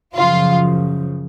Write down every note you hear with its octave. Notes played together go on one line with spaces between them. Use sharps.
F#2 C#3 F3 F4